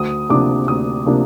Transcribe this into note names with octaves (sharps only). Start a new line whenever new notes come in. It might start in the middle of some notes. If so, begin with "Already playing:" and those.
Already playing: D2 D#6
C3 F3 A#3 D4 D6
D2 D#6
C3 F3 A#3 D4